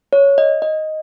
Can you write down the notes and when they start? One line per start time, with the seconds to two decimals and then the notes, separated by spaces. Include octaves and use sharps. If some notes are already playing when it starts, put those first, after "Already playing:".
0.13 C#5
0.38 D#5
0.62 D#5